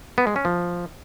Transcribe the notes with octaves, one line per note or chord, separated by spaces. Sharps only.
B3
G#3
C#4
F3